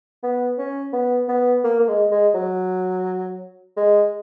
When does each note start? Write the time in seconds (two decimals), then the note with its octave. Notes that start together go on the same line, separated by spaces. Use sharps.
0.23 B3
0.58 C#4
0.93 B3
1.28 B3
1.64 A#3
1.79 A#3
1.88 G#3
2.11 G#3
2.35 F#3
3.77 G#3